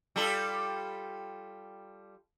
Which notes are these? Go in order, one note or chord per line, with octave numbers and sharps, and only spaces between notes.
G3 F4 A4